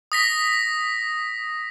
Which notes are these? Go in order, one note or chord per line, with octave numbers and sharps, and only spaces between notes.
D#6 A#6 B6